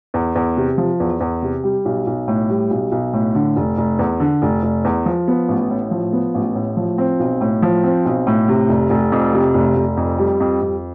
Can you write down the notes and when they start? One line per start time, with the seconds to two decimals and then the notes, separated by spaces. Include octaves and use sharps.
0.14 E2
0.35 E2
0.57 C3
0.78 F3
1.00 E2
1.20 E2
1.42 C3
1.64 G3
1.85 B1
2.06 B1
2.28 A2
2.49 G3
2.70 B1
2.91 B1
3.13 A2
3.35 D3
3.56 F1
3.77 F1
3.99 E2
4.20 D3
4.42 F1
4.63 F1
4.85 E2
5.06 F3
5.28 B3
5.48 A1
5.70 A2
5.91 F3
6.13 B3
6.34 A1
6.55 A2
6.77 F3
6.98 C4
7.19 B1
7.41 A2
7.62 F3
7.84 C4
8.05 B1
8.27 A2
8.48 C3
8.69 F1
8.90 F1
9.12 F2
9.33 C3
9.54 F1
9.76 F1
9.97 F2
10.18 G3
10.40 F2
10.62 F2